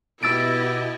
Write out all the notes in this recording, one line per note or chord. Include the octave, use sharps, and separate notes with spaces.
B2 E4 G4 D#5 E6 A6 D7